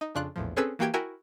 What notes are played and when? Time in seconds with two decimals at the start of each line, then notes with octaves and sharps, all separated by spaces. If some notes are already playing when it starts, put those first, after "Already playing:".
0.01 D#4
0.15 F2 C#3 D4 F4 F#6
0.36 A#1 E2 A2 F3
0.56 C4 C#4 G#4 A4 B4 E6
0.79 E3 A#3 F#4 G4 G5 G#6
0.94 E4 F#4 A#4 E5 G5 G#5